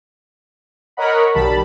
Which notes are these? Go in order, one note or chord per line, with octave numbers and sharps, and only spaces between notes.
A#4 C#5 D#5 F#5 B5
B1 D#3 G3 A5 B5